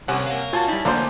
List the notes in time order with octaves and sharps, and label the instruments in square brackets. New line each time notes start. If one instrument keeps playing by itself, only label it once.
[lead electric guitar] C2 [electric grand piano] C3 F#5 [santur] C#4 G#5
[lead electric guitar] A#4 F5
[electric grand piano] F4 F#4 [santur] G#5 A5
[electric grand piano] G3 D#4 [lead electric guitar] E4
[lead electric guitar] D2 [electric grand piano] D3 [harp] A#3 C5 [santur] D5